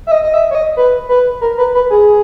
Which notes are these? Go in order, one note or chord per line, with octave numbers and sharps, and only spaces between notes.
E5
D#5
D#5
E5
C#5
D#5
B4
B4
A#4
B4
B4
G#4